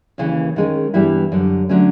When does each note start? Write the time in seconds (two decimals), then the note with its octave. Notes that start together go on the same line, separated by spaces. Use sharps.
0.18 D#2 C#3 E3
0.56 D#3 G#3 C#4
0.94 G2 E3 G3 B3 E4
1.32 F#2 D3 G3
1.69 D3 F#3 A3 C#4